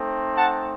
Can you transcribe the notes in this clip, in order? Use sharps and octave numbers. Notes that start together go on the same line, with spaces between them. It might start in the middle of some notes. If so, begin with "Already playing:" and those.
Already playing: A3 C4 D#4
F#5 A5